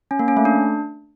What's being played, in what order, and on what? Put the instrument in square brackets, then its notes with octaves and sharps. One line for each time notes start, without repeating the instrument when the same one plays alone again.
[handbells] C#4
A#3
C#4
A3
D4